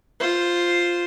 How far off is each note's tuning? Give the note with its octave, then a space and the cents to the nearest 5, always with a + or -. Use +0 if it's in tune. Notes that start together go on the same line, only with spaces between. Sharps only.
F4 +0 C5 +0